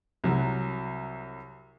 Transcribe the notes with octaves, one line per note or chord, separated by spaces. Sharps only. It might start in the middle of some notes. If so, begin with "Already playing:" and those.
C2 F#3